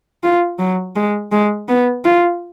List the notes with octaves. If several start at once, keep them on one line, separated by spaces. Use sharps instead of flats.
F4
F#3
G#3
G#3
B3
F4